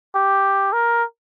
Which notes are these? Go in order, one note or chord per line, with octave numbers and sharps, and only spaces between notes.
G4
A#4